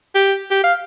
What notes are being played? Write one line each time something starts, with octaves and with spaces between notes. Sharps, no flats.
G4
G4
F5